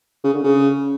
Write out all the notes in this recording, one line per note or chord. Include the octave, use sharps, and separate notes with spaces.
C#3
D3
C#3